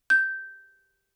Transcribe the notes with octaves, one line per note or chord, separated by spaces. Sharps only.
G6